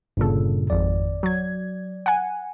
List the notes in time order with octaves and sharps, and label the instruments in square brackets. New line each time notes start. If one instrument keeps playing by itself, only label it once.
[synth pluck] G1 A4 [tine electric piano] G2 A#2 C#3
[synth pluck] G#1 F2 [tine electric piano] D5
[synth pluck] F#3 G#6
F#5 G#5